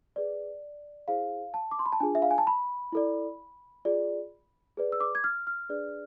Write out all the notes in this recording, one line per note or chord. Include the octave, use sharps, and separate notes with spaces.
G#4 B4 D5
E4 G#4 C5 F5
A5
D6
C6
B5
A5
D4 F4 G#4 G#5
E5
F5
G#5
A5
B5
E4 A4 D5
F4 G#4 D5
G#4 B4 D5
E6
D6
G#6
F6
F6
D4 G#4 B4 D5